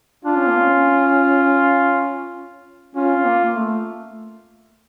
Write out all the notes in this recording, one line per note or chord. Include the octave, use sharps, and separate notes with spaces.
D4 F4
C#4
A#3
C#4
C#4 F4
C#4
A#3
A#3
A3